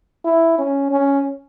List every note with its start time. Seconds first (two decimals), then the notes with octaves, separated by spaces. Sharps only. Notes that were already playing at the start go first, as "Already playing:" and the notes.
0.25 E4
0.58 C#4
0.91 C#4